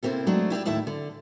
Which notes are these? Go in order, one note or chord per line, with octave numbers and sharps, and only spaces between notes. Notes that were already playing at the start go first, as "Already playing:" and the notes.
C3 A#3 C4 E4 A4
F#3 G#3 A3 C4 D4
E4 G4 D5 E5
D#2 A2 E4 E5 A5
D3